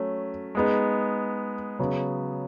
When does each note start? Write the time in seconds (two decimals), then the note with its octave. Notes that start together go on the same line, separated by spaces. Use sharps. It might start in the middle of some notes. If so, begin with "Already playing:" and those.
Already playing: F#3 A3 C#4
0.55 G#3 B3 D#4
1.79 C#3 F#3 B3